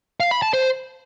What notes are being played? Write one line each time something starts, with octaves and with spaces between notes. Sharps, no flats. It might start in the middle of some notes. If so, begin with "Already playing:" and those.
F5
B5
A5
C5